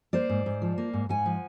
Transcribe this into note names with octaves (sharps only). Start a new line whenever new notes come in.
A#3 C5 D5
G#2
G#2
F3
A#3
G#2
G#2 F#5 G#5
F3